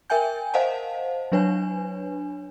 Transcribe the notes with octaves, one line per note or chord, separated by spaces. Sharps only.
A#4 E5 G5 G#5 G6
C5 D#5 F5 F#5 A5
F#3 D4 B4 C#5 G#5